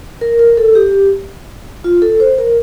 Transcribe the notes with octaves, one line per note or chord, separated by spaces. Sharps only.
A#4
A#4
A4
G4
F4
A4
C5
A#4